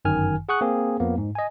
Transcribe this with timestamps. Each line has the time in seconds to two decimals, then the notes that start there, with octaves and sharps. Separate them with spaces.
0.05 G1 F#2 D#3 G#5 F6
0.49 G#4 F#5 C#6 D#6 F#6
0.61 A#3 C4 G#4
1.00 F2 F3 A#3 B3
1.18 G#2
1.35 D#5 G#5